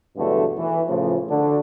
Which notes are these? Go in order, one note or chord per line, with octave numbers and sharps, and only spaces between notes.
E2 G2 B2 D3 F#3 A3
E3
A2 C#3 E3 F3
D3 D4 F#4